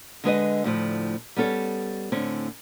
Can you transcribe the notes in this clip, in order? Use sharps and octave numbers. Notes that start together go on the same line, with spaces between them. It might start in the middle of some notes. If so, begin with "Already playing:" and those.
D3 G#3 B4 D#5
D2 A2 F3
G3 B3 C#4 A4
A2 D3 C4 C#4